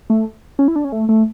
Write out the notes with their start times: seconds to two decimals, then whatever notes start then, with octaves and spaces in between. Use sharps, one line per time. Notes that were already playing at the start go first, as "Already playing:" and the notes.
0.10 A3
0.59 C#4
0.68 E4
0.76 D4
0.84 C#4
0.92 A3
1.09 A3